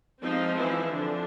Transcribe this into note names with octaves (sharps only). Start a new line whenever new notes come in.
F3 G#3 C4 D#4
E3 E4
D3 F3 D4